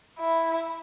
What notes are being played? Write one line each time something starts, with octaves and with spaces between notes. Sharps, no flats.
E4